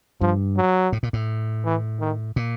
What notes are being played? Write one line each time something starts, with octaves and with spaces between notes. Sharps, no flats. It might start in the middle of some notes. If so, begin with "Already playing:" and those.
G2 F3
F#3
A2
A#2
A2
E3
D#3
A#2